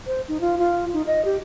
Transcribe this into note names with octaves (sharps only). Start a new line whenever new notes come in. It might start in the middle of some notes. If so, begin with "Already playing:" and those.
C5
D#4
F4
F4
D#4
D#5
G4